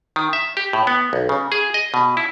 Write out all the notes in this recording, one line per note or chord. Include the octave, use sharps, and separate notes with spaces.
D#3
E5
G4
A2
B3
B1
C#3
G#4
D#5
B2
E4